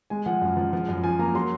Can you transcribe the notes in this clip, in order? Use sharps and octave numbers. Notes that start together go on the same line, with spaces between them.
G#3 G#5
F3 F#5
F#2
F3
F3
F#2
F3 G#5
A#3 A#5
F#3 C6